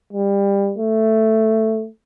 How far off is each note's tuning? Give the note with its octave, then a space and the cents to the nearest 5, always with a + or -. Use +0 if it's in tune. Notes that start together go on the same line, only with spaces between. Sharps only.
G3 +25
A3 +5